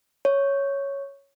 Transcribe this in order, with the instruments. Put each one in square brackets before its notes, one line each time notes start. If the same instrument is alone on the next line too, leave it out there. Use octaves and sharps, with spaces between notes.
[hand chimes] C#5